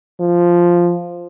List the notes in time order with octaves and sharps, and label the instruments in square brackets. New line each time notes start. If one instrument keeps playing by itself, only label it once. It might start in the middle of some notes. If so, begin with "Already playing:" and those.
[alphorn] F3